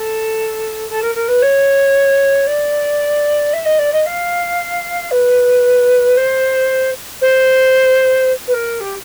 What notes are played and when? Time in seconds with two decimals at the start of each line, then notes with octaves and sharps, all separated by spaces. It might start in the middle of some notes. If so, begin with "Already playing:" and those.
Already playing: A4
0.89 A4
1.02 A#4
1.15 A#4
1.28 B4
1.42 C#5
2.46 D5
3.53 E5
3.65 D#5
3.78 D5
3.93 D#5
4.06 F5
5.11 B4
6.16 C5
7.21 C5
8.47 B4
8.53 A#4
8.80 G4